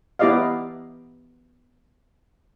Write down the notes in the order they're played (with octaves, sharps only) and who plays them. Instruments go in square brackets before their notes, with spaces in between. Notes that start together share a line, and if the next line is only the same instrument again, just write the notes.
[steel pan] B3 E4 G4 D5 D#5 F5